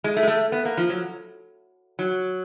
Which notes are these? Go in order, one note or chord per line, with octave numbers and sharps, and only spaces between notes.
G#3
A3
G#3
A3
B3
A#3
F3
F#3
F#3